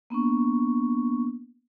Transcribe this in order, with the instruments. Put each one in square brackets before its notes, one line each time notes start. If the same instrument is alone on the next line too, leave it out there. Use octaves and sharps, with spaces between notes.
[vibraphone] A#3 B3 D4 C#6